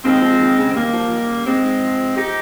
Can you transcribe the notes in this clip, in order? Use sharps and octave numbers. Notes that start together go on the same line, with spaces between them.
D#2 G#3 C4
F3
D#2
C#3
C4
D#2 G3 A#3
F3
D#2
C#3
G#2 G#3 C4
G#2
F3
F3
D#4 G4